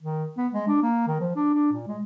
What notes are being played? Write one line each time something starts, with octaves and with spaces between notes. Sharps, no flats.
D#3
B3
G#3
D4
A#3
D#3
F3
D4
D4
A#2
G#3